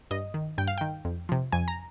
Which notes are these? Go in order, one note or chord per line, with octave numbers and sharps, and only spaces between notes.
G2 D#5
D#3
G2 G5
F5
D#3 G5
F2
C3 F3
F2 G#5
A#5